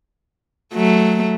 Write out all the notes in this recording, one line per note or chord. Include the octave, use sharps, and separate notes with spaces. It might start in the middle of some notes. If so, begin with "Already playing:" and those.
F#3 A3